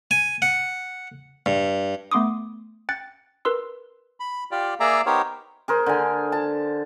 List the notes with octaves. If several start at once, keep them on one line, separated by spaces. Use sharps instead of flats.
G#5
F#5
G2
A3 B3 C6 D6 D#6
G5 F#6 A6 C#7
A#4 B4 C6 E6
B5
F4 G4 D5
A#3 G#4 D5 E5 A#5
B3 D#4 G4 A#4 C5 C#5
G#4 A#4 C5
D3 G#5
A5